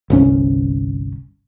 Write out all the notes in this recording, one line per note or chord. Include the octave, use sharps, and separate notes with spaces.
G1 C2 C#4